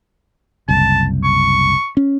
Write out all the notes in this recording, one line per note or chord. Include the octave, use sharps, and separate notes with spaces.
F#1 C2 A5
C#6
C#4